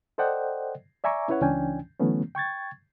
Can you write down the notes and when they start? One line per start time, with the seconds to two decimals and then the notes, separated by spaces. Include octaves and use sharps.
0.18 A4 C5 D5 D#5 F#5 G5
1.04 D5 E5 G#5 A#5 C#6 D6
1.28 C#4 E4 B4 C#5 F#5
1.41 C#2 E3 C#4 D4 G5 G#5
1.99 D3 E3 F#3 A3 B3 C#4
2.35 G5 C#6 G#6 A6